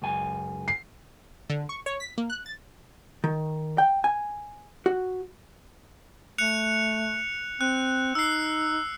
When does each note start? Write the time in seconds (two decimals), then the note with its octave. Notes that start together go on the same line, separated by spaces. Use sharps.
0.02 C#2 F#2 G#5
0.68 C7
1.50 D3
1.69 C#6
1.86 C#5
2.00 B6
2.18 A#3
2.30 F#6
2.46 A6
3.24 D#3
3.78 G5
4.04 G#5
4.86 F#4
6.38 A3 F#6 C#7 F7
7.61 C4 F#6
8.15 D#4 E6 C7